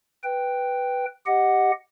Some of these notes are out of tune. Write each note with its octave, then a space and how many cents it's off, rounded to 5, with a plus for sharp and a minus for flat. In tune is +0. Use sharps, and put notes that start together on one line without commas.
B4 +0 G5 +0
G4 +0 D#5 +0 F#5 +0